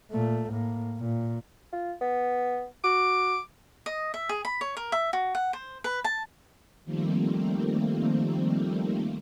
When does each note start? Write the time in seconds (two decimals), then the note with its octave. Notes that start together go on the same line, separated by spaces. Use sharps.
0.12 A#2 A3
0.51 A2 A#3
0.97 A#2
1.73 F4
2.01 B3
2.84 F#4 D6
3.86 D#5
4.14 E5
4.29 G#4
4.45 B5
4.61 C#5
4.77 A#4
4.92 E5
5.13 F#4
5.35 F#5
5.53 C5
5.84 B4
6.04 A5
6.85 D#3 F3 G3 A3 A#3 C4